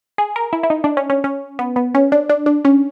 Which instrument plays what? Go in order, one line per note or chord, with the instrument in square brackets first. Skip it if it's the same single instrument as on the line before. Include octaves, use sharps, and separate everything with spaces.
[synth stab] G#4
A#4
E4
E4
D#4
D4
C#4
C#4
C#4
B3
B3
C#4
D4
D4
D4
C#4